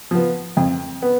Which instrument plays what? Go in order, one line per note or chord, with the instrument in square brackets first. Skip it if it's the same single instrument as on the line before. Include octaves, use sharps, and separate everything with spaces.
[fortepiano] F3 B3
F2
B3